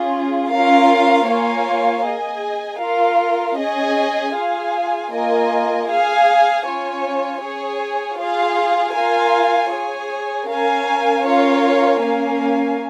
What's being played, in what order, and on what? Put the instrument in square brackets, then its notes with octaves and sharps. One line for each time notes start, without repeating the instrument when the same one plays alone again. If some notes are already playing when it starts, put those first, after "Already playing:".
Already playing: [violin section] C#4 F4 G#4
C#4 F4 A#4 F5
A#3 F4 C#5 F5 G#5
G#4 D#5 G#5
F4 A#4 F5
C#4 G#4 D#5 G#5
F4 G#4 F5 G#5
A#3 F4 A#4 D#5 G#5
G#4 F5 G#5
C#4 F4 C#5 G#5
G#4 C#5 G#5
F4 G#4 F5
F4 A#4 F5 G#5
G#4 C#5 G#5
C#4 A#4 F5 G#5
C#4 F4 A#4 C#5 F5
A#3 C#4 A#4 F5 G#5